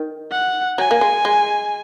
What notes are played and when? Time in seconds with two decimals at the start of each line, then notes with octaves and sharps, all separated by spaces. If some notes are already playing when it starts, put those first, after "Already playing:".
Already playing: D#3
0.31 F#5
0.78 F#3 G#5
0.91 A#3
1.01 G#3
1.25 G#3